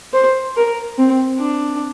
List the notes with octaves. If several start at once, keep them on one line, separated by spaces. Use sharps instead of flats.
C5
A#4
C4
D4